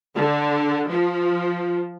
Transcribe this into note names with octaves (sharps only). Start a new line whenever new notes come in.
D3
F3